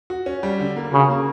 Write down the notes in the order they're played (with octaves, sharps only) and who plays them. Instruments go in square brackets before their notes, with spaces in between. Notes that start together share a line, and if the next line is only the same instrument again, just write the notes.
[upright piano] F#4
C#4
G3
D3
A#3
[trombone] C#3 [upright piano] F#4
[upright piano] A#3